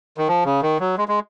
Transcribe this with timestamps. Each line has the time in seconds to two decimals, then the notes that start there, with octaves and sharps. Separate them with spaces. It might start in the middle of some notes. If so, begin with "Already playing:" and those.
0.18 D#3
0.28 F3
0.45 C#3
0.62 D#3
0.80 F#3
0.98 G#3
1.08 G#3